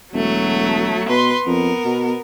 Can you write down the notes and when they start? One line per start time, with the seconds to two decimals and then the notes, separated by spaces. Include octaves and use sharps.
0.13 E1 F#3 A3
1.08 B2 B4 C6
1.46 F2 B3 A#4
1.84 B2